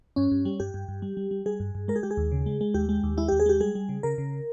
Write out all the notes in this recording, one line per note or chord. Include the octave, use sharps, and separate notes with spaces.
G2 C#4
G2
G3
G2 G4
G2
G2
G3
G3
G3
G3 G#4
G2
G2
G#3 A#4
G#4
G#3 G4
G#4
D#2
C#3
G#3
G#3
D#2 G4
G#3
D#2
G#3 E4
D#2 G4
G#4
G#3 G4
G3 G#4
G3
C#3
C#3 A#4
C#3